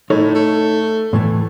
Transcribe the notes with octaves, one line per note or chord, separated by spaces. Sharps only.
A2 D#4 A4 C#5
A3
A2 E3 A3